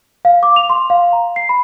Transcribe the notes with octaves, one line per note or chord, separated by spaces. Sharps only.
F5
D6
F7
C6
F5
A#5
C7
B5